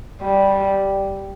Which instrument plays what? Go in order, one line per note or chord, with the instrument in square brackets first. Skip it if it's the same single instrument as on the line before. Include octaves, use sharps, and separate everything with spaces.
[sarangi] G3